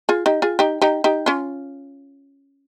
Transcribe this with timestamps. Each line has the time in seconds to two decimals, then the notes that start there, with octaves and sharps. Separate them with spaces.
0.09 F4 G#4
0.26 D#4 G4
0.42 F4 G#4
0.59 D#4 G4
0.82 D#4 G4
1.04 D#4 G4
1.26 C#4 F4